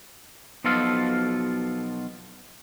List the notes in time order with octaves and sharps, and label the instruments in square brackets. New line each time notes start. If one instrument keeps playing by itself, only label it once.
[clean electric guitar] B1 B2 F3 F4 A4 F5